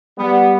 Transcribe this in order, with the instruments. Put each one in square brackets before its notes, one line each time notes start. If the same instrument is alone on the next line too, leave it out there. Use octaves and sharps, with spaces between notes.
[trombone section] G3 B3